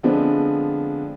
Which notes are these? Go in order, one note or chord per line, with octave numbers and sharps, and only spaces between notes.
D3 F3 G#3 B3 C4 D4